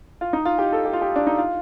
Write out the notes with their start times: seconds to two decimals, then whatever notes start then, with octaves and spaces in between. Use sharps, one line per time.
0.21 F4
0.33 D#4
0.45 F4
0.59 G4
0.73 A4
0.85 G4
0.93 F4
1.02 G4
1.16 D4
1.27 D#4
1.38 F4